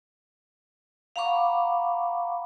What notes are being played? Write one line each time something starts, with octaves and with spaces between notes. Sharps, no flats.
F5 F#5 A#5 B5 C#6 D6